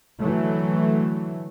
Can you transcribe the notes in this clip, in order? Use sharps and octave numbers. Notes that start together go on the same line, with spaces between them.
D3 E3 F#3 A3